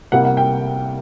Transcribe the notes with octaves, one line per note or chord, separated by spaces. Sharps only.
C2 C3 G3 A#3 F#5
F#5
G5